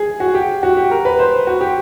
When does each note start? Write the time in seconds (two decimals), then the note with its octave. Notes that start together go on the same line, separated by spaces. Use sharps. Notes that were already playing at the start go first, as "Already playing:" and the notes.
Already playing: G#4
0.20 F#4
0.35 G4
0.63 F#4
0.77 G4
0.91 A#4
1.05 B4
1.19 C5
1.47 F#4
1.61 G4